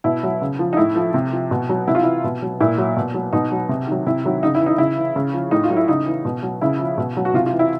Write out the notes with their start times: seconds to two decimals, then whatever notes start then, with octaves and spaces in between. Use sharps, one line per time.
0.04 B2 E4
0.23 F#3
0.42 C#3
0.59 F3
0.73 D#4
0.77 A2 E4
0.96 F3
1.14 C3
1.33 F3
1.51 B2
1.69 F#3
1.88 C3 E4
1.95 F4
2.03 E3 E4
2.24 B2
2.42 F#3
2.61 A#2 E4
2.78 F#3
2.97 B2
3.14 F#3
3.33 B2 D#4
3.52 F#3
3.69 C3
3.87 D#3 F#3
4.07 C3 E4
4.25 D#3 F#3
4.43 C#3 D#4
4.55 E4
4.61 E3
4.66 D#4
4.78 C#3 E4
4.97 E3
5.16 C#3
5.33 F3
5.51 A2 D#4
5.64 F4
5.70 F#3
5.76 E4
5.88 C#3 D#4
6.07 E3
6.25 B2
6.43 F#3
6.61 C#3 E4
6.79 F3
6.98 B2
7.17 F#3
7.25 F#4
7.34 C3 F4
7.46 F4
7.52 E3
7.59 E4